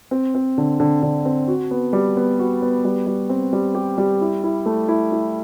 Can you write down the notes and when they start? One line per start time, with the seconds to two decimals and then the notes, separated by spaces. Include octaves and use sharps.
0.11 C4
0.35 C4
0.58 D3
0.80 D3
1.03 D3
1.25 C4
1.48 F#4
1.71 B3
1.93 G3
2.17 B3
2.39 F#4
2.62 B3
2.85 G3
3.07 G3
3.29 C4
3.53 G3
3.75 G4
3.98 G3
4.21 E4
4.44 E4
4.66 A3
4.88 E4
5.12 E4